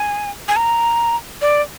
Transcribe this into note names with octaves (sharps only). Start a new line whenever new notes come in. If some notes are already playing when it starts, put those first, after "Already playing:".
Already playing: G#5
G#5
A#5
D5